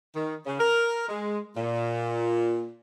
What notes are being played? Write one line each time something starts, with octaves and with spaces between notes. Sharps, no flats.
D#3
C#3
A#4
G#3
A#2